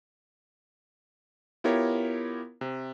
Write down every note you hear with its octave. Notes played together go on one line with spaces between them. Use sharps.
B3 E4 F4 G4 A#4 C#5
C3